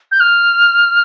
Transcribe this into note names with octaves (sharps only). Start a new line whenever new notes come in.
G6
F6